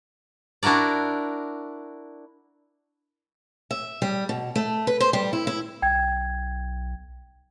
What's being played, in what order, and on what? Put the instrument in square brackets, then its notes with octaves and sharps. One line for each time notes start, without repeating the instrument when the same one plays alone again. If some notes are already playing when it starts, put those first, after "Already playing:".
[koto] D4 E4 F#4 A#4 D5
[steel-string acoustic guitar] E5
G3
B2
A3
B4
C5
G3
E4
E4
[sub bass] B1 [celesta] G5 G#6